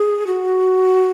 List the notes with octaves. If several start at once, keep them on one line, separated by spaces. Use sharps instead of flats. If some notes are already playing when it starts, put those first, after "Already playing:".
Already playing: G#4
F#4